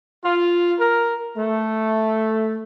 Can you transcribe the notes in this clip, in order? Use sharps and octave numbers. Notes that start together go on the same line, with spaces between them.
F4
A#4
A3